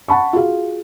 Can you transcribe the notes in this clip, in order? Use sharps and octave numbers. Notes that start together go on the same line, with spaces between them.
F#5 A5 B5 C#6
F4 F#4 G#4 F5